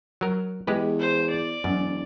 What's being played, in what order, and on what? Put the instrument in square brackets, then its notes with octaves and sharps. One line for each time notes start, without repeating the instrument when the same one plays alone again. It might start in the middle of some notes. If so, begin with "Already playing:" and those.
[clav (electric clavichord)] F#3 A#4
[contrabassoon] E2 [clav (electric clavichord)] G#3 G4 B4
[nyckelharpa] C5
D5
[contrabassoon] E1 [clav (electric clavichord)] F#2